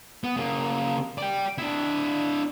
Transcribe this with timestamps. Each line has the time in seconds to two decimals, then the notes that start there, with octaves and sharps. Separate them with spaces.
0.24 B3
0.37 C#3 A#3
1.18 D5 G5
1.58 D4 E4